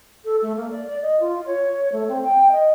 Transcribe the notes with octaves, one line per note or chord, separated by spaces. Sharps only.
A4
A3
A#3
D5
D5
D#5
F4
C#5
A3
C4
G5
D#5